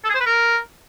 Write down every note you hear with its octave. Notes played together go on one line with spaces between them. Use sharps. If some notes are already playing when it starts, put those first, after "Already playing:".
A4
G#4
C5
B4
A#4